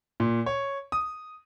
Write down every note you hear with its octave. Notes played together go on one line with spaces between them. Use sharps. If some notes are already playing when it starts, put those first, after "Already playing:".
A#2
C#5
D#6